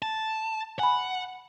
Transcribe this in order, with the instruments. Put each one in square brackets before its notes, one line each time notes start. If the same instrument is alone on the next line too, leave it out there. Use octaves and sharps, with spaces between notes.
[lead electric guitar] A5
[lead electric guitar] F#5 [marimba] G#5 B5